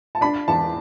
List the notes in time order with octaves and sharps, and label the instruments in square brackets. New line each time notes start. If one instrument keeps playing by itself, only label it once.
[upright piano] A5
[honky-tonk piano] D4 [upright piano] B5
[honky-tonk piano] E2 [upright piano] A5